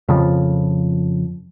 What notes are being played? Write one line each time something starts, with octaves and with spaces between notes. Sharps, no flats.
F2 C#3 F3